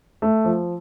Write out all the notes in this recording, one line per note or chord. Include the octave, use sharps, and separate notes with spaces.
A3
F3